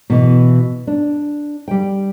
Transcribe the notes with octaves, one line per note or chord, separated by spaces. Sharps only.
B2 E3
D4
G3 G5